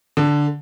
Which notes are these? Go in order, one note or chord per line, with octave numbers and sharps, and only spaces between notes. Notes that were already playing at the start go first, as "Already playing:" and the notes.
D3